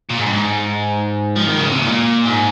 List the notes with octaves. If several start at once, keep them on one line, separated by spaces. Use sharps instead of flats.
A#2
G#2
G2
G#2
F3
D#3
C#3
C3
A#2
G#2